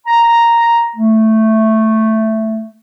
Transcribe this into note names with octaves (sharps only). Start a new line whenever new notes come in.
A#5
A3